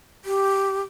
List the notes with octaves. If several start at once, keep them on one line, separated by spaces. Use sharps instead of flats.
G4